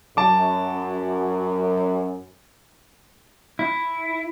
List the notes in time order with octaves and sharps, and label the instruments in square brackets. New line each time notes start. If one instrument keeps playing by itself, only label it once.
[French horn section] F#2 [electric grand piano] A5 D6
[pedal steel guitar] E4